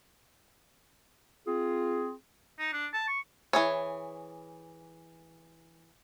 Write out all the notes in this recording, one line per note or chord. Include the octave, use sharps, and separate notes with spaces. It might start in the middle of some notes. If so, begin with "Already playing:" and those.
C4 F4 G#4
D#4
D4
A5
C#6
E3 G#4 C#5